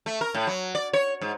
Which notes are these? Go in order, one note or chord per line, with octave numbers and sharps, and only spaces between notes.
A3
A#4
A2
F#3
D5
C#5
G#2